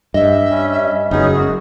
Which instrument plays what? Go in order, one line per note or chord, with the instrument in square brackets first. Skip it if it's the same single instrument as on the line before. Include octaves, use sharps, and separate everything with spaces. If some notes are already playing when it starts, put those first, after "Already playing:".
[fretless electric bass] G2 [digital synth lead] D#5 [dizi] E5
[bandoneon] G3 C#4
[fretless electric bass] F#1 F#2 [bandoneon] B3 C#4 D#4 [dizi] G#4
[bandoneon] G#3 F#4